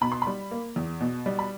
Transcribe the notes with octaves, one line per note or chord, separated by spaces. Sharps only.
B2 B5
C6
B5
G3
A#3
E2
B2
G3
B5